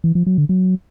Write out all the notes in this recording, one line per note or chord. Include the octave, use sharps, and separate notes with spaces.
E3
F3
F#3
D3
F#3